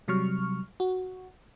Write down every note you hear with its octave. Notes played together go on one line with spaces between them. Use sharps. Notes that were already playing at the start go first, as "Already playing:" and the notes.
C3 F#3 G3 C#6 F6
F#4